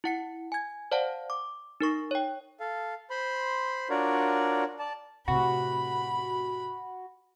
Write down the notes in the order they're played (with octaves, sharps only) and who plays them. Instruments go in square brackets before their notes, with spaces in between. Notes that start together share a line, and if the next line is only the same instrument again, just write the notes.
[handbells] E4 F#5 C#7
G#5 G#6
C5 D5 F5 F#5 A5
D6
D#4 A#4 C#6 A#6
C#5 G5
[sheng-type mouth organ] A4 F5
C5 B5 C6
D4 F4 F#4 A#4 C#5 D5
D5 A5
[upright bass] A2 C3 [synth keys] F#4 [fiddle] B5